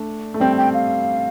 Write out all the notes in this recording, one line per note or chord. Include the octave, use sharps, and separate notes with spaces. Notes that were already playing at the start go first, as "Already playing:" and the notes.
Already playing: A3 D4
A3
G3 C4 G5
G5
F5